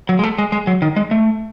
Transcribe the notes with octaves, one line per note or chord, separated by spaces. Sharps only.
F#3
G#3
A3
G#3
G#3
F#3
D#3
G#3
A3